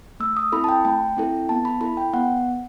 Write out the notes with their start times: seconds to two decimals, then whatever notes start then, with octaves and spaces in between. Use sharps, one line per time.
0.20 A3 E6
0.37 D#6
0.52 C4 E4 A4 B5
0.64 A5
0.69 G5
0.85 A3 G5
1.17 C4 E4 A4
1.49 B3 A5
1.65 B5
1.81 E4 A4 B5
1.97 G5
2.13 B3 F#5